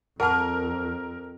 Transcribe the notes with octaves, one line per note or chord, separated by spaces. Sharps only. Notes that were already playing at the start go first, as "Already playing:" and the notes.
F2 G#4 A#4 F#5 A5 F6